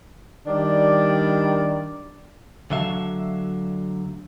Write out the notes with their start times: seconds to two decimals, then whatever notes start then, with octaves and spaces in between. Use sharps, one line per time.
0.47 D#3 G3 D4 D5
2.70 D2 D3 F#3 E5 F5 A5